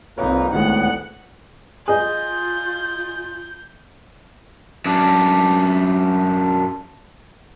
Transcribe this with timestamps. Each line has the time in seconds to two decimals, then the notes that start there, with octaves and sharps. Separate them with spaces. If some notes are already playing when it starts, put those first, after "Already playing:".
0.18 C2 F2 A#3 C4 D#4 F4 B4 C#5
0.53 D2 A2 D#3 G#3 A3 B3 F#5
1.88 F4 G#4 D#5 G6
4.86 F#2 D4